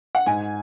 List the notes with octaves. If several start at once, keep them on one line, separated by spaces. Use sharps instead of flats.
F#5
G#2 G#5